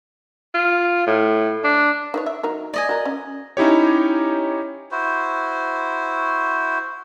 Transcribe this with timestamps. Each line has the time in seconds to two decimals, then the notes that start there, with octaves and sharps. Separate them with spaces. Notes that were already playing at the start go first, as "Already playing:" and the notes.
0.55 F4
1.07 A2
1.64 D4
2.14 D#4 B4 C#5
2.26 E5
2.43 F#3 D#4 A#4
2.74 D5 D#5 G#5
2.89 F#4 A#4
3.05 C#4
3.57 C#4 D#4 E4 G4 C#5
4.91 E4 F#4 C5